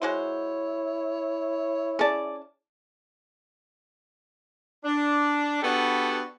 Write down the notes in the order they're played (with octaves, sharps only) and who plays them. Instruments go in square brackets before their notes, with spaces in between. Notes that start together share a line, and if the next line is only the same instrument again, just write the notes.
[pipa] G#3 F#4 C5 [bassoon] E4 [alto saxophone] C#5
[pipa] C#4 A5 [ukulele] G#4 D5
[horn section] D4
B3 D4 F#4 G4 A4 B4